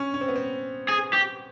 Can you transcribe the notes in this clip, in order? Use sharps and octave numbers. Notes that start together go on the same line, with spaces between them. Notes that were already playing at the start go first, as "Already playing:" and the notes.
Already playing: C#4
C#4
C4
B3
C4
G#4
G4